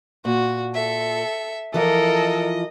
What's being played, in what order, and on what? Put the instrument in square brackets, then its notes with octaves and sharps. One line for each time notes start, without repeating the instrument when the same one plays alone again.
[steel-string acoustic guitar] A#2 [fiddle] F#4
[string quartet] A4 [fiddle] E5
[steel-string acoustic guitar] E3 F3 [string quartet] A4 A#4 [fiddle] D#5